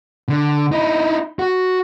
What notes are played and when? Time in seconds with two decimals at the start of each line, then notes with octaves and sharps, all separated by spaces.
0.29 D3
0.72 D#4 E4
1.39 F#4